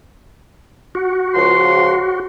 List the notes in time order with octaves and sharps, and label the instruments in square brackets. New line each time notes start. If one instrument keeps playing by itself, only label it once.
[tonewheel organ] F#4
[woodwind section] C#2 F3 C6